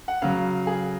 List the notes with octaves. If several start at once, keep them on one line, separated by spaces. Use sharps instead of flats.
F#5
C#3 F#3 F5
G#4